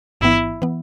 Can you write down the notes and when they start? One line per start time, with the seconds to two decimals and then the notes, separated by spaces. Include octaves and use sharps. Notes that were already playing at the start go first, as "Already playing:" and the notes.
0.21 A1 G#2 E3 B3 E4
0.62 E3 B3